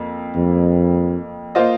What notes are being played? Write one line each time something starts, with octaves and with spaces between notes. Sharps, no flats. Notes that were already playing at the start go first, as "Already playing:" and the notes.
Already playing: F2 A#3
F2
A#3 F4 C5 D#5